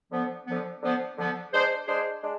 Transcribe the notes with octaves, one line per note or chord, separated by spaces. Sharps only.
D3 F3 B3
D3 F3 B3
D3 F3 B3
D3 F3 B3
G#3 D4 G#4 C5
G#3 D4 G#4 C5
G#3 D4